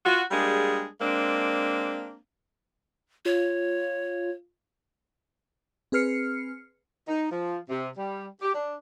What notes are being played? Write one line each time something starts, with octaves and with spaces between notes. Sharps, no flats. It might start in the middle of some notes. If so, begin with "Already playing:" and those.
F4 F#4
G3 G#3 A#3 D4 G#4
G#3 A#3 C4 D4
F4 C#5
C4 G#4 B4 F6 C7 C#7
D#4
F3
C3
G3
G4
D4